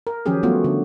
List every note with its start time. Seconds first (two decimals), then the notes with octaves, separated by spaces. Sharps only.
0.07 A#4
0.26 D#3 F3 F#3 C#4 G4 G#4
0.43 F#3 G3 A3 B3 F4 F#4
0.64 D3